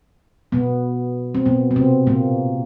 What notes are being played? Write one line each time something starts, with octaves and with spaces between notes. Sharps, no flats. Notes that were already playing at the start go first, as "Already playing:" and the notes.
B2 B3
C4
B2 B3
B3
C3 C4
A#2 A#3